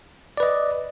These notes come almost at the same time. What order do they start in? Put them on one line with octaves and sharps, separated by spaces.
D5 B4 D#5